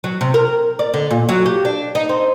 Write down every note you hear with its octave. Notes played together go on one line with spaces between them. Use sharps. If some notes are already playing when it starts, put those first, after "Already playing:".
F#3
C3
A#4
D5
D3
A#2
F#3
G4
D4
D#4
C4